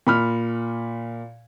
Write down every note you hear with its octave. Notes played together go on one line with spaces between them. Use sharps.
A#2 B5 F6